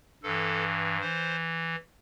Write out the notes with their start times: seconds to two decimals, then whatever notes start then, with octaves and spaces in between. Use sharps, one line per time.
0.23 G2 E3 A4
1.01 E3 C5